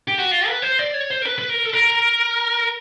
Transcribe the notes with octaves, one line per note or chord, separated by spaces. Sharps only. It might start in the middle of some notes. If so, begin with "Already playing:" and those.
G4
F#4
F4
B4
C5
D5
C#5
C5
A#4
B4
B4
A#4
A4
A#4